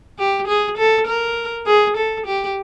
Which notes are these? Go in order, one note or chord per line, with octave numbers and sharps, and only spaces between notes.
G4
G#4
A4
A#4
G#4
A4
G4